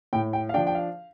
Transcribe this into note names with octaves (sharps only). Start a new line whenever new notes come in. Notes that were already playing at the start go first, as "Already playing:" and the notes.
A2 G5
G5
F5
F3 D4 G5
G5
F5